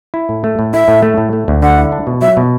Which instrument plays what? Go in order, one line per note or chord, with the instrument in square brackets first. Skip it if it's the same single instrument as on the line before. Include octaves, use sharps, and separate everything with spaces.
[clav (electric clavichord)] E4
A2
A3
A2
[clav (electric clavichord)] E4 [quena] E5
[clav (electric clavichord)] A2
A3
A2
A3
D2
[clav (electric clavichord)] D3 [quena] F#5
[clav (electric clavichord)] E4
D4
B2
[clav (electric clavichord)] F#3 [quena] E5
[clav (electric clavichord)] B2